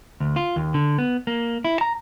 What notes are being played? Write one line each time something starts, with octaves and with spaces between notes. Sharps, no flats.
D2
F4
D#2
D3
B3
A#3
E4
A#5